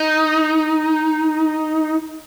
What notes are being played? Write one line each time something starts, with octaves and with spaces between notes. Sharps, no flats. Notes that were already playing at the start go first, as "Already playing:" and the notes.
Already playing: D#4